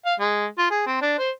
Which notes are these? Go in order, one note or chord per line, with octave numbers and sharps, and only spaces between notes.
F5
G#3
F4
G#4
C4
D4
C5